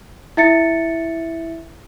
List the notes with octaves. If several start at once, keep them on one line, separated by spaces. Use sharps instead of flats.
E4 E5 A6 C#7